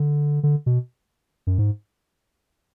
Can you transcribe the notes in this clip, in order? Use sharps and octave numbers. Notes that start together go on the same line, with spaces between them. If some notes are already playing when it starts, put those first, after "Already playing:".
Already playing: D3
D3
B2
F#2
G#2